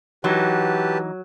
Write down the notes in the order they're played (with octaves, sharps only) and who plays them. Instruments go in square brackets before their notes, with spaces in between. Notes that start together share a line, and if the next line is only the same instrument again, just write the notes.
[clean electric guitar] E3 D#4 [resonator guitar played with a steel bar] F#3 [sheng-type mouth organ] G4 B4 A5